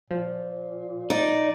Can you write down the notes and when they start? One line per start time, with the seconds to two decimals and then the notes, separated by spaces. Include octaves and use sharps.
0.11 A#2 F3
1.10 D#4 D5